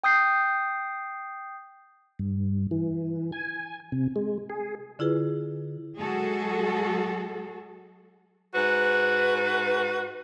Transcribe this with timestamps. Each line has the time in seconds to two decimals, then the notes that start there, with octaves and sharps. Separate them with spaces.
0.04 G5 D#6 G6 C7
2.19 G2
2.71 E3
3.32 G#5
3.92 C3
4.16 G#3
4.50 G#4
4.99 D3 E4 F4 G#4 B4
5.99 F#3 G#3 F#4 G#4 A4
8.54 G#2 F#4 B4